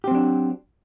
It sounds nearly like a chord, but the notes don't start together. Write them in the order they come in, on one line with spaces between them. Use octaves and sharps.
G4 C4 F#3 D4